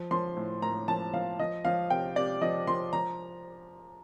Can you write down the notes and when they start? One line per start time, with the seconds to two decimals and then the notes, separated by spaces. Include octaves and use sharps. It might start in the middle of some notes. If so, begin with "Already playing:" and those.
Already playing: F3
0.11 F3 C6
0.37 A2
0.62 A2 A#5
0.88 F3 A5
1.13 F3 F5
1.39 F3 D#5
1.65 F3 F5
1.90 C3 G5
2.16 C3 D5
2.41 F3 D#5
2.67 F3 C6
2.93 F3 A#5